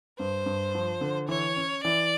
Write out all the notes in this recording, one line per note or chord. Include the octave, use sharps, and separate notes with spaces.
G2 C5
G2
F3
D3
E3 C#5
C#4
E3 D5